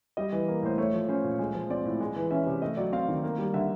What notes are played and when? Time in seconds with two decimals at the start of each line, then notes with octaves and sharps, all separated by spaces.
0.17 G3 D#5
0.32 E3
0.48 A#3
0.62 A2 C5
0.78 A3 C#5
0.94 F3
1.08 C#4 C5
1.24 A#2
1.39 G#3
1.54 F3
1.70 C4 D5
1.85 A2
2.01 G#3
2.16 E3
2.31 C#4 E5
2.46 C3
2.62 A3 D#5
2.77 F#3 D5
2.93 C4 F5
3.08 D#3
3.23 A#3
3.38 G3
3.54 D3 E5